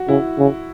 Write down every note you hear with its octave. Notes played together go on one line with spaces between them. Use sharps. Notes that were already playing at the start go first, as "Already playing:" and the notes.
Already playing: F#4
C#3 E4
C#3